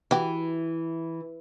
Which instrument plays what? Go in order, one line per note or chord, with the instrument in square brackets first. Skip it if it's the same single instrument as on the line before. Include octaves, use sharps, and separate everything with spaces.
[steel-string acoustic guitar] E3 [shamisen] F#4 G4